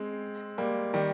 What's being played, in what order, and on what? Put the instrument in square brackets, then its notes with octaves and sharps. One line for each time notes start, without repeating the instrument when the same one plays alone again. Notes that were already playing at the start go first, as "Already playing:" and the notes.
Already playing: [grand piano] G#3 C4
G3 A#3
D#3 G3